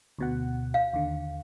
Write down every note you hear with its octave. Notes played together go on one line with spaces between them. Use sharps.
D2 B2 F#5
F5
D#2 D3